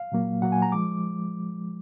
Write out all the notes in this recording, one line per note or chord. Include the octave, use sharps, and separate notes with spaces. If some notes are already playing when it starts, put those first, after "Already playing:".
Already playing: F5
A#2 F#3 A#3
A#2 F#3 A#3 F#5
G#5
A#5
F3 G#3 D6